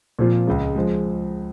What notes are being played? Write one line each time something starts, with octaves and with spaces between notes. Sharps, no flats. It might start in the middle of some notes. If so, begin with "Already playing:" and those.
A#2 F3 C4 F4
C#2 C#3 G#3
F3 G#3